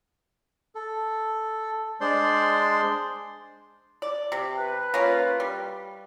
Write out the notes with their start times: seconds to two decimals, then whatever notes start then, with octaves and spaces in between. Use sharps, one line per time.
0.75 A4
2.01 G#3 D4 C5 D5 C6
4.02 D5
4.32 C3
4.56 B4
4.94 A#3 C#4 F4
5.40 G3